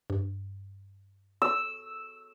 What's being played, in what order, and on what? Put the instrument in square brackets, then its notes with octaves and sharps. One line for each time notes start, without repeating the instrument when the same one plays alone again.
[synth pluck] G2
[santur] E6